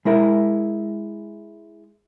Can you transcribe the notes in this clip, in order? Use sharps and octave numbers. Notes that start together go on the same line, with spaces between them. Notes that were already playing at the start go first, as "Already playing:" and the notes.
G#3 E4 A#4 E5